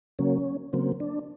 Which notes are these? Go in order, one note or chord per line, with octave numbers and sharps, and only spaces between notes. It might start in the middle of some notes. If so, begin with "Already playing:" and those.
C#3 F#3 A#3 C#4
C#3 F#3 A#3 C4
D4